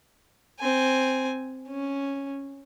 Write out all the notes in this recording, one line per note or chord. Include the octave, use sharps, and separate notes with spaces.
C4 G#5
C#4